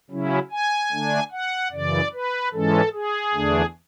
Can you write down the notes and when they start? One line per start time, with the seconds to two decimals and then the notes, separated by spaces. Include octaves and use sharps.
0.10 C#3 F#3 C#4 E4
0.51 G#5
0.92 D3 A3 D4
1.32 F#5
1.72 F#2 C#3 E3 D5
2.13 B4
2.52 G#2 E3 G#3 C#4 A4
2.93 G#4
3.34 E2 D3 A3 D4